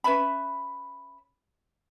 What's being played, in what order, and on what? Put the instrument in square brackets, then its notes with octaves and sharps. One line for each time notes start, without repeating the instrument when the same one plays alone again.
[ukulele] C#4 B4 E5 B5